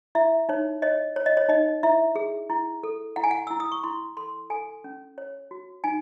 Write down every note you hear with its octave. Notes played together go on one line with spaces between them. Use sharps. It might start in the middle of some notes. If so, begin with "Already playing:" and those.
E4 E5
D#4 C#5
C#5 D#5
C#5
D#5
C#5
D#4 D#5
E4 E5
G#4
E4
A4
E4 F#5
G#5
F#5
E4 E6
D#6
C#6
E4 C6
A4 C6
A4 G#5
C#4
C#5
F#4
D#4 G#5